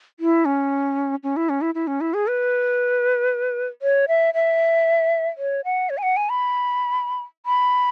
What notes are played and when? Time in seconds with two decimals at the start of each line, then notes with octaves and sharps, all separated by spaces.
0.20 E4
0.45 C#4
1.23 C#4
1.37 E4
1.49 C#4
1.61 E4
1.75 E4
1.87 C#4
2.01 E4
2.14 G#4
2.27 B4
3.82 C#5
4.08 E5
4.34 E5
5.38 C#5
5.65 F#5
5.90 C#5
5.98 G#5
6.03 F#5
6.17 G#5
6.30 B5
7.46 B5